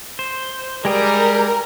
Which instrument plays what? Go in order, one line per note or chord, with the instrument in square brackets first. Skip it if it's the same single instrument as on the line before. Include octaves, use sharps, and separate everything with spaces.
[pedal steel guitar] C5
[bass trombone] G3 [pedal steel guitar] G#3 G4 G#4 [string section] A#4